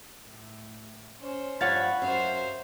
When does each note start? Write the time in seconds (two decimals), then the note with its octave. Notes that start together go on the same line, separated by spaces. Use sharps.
0.25 A2
1.20 C#4 C5
1.61 G2 F3 C#5 F5 F#5 B5 A6
2.02 F#2 C5 E5 F5